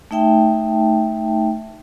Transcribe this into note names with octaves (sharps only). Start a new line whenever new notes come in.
A3 D#4 E5 G5 A5